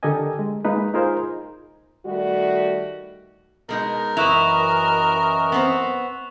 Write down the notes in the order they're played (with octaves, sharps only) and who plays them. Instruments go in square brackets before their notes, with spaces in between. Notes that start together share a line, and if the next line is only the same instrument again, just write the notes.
[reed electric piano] D3 G4 A4 A#4 D#5 G#5
G#3
G#3 A#3 D#4 B4
D#4 F4 G#4 A#4 C5
[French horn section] D#3 G3 A3 F#4
[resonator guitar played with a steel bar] B2 G#3 D#4 [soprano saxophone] A#4
[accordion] F#2 E3 D#5 [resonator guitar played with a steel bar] E4 B4 [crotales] C#6 F#6 F7
[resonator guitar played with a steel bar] B3 C4 C5